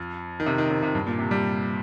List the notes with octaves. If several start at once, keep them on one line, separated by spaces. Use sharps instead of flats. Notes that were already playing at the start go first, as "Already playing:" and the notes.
Already playing: F2
D#3
C3
D#3
C3
C3
G2
A#2
C3
G3